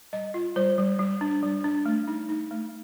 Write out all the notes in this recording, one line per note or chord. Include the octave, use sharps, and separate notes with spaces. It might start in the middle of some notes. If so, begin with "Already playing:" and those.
G3 D#5
F4
G3 C5
G3
G3
D4
G3
D4
A3
D#4
D#4
A3